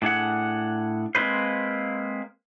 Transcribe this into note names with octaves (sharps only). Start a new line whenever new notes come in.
A2 D4 G#4 F#5
G#3 A#3 C4 D#4 B4 C5